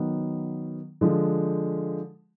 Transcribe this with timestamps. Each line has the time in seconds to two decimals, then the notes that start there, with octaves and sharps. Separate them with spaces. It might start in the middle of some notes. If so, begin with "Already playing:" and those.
Already playing: D#3 F#3 B3
1.01 D3 F3 G#3